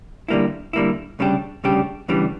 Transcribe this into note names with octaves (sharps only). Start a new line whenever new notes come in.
D3 G3 A#3 E4
D3 G3 A#3 E4
D2 C#3 G3 D4 G4
D2 C#3 G3 D4 G4
D2 C#3 E3 G3 D4